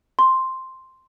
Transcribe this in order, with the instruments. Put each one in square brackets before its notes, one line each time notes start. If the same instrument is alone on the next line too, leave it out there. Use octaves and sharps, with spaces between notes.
[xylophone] C6